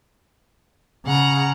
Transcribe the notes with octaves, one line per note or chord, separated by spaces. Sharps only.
C#3 F#5 A#5